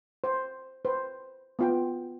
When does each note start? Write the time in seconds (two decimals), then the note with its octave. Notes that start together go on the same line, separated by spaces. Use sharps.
0.24 C5
0.85 B4 C5
1.59 B3 F4 G5